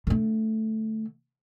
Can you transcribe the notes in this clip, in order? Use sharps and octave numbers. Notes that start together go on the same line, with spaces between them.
D3 A3